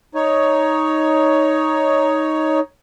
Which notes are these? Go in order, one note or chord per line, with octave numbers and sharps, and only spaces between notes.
D#4 C#5